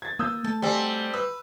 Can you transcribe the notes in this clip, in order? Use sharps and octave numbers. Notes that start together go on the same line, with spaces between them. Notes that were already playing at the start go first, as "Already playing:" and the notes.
G#6 A6
A#3 D#6 E6 G6
A3 A5
G3 C4 F#4 A4 G#5
B4 E6